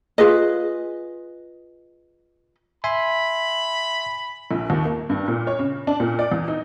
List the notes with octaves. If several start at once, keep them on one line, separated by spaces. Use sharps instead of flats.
F4 G#4 B4 D#5
E5 G#5 B5 C6
A#1
D#2
A#3
G2
A#2
C#5
C#3
D4
A#2
D5
E2
D#4